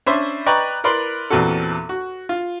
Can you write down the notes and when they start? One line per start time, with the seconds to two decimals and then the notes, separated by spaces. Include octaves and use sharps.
0.06 C#4 D4 C5 E5 B5 C6
0.46 B4 D5 D#5 G5 A#5 C#6
0.84 E4 A#4 B4 D5 B5 C6
1.30 E2 A#2 C4 F#4 A4
1.89 F#4
2.29 F4